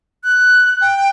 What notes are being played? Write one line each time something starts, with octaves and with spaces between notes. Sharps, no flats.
F#6
G5